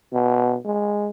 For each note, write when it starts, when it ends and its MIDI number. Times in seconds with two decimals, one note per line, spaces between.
0.13 0.57 47
0.65 1.09 56